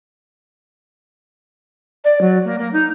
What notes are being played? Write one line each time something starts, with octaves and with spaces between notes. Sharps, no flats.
D5
F#3
A#3
A#3
D#4